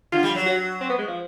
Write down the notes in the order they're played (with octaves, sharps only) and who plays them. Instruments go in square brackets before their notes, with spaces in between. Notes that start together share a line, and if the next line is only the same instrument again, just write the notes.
[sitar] D3 [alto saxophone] F4
[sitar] G3
F#3
[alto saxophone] F#4
C4
B3
G#3
F3